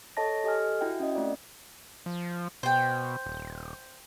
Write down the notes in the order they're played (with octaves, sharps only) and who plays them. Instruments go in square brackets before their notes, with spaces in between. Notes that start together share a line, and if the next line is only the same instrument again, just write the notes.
[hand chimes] A4 C#5 D#5 A5 A#6
G4 A4 D#5 G#5 F6
E4 F#4 E5 G5
C#4 D#5
A3 C4 F4 D5
[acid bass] F3
[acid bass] B2 [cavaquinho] C5 G5
[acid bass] D#1